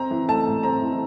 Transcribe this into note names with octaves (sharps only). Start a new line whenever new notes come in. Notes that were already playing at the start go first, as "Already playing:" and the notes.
Already playing: C4 A#5
E3
A3 A5
A2
C4 A#5
E3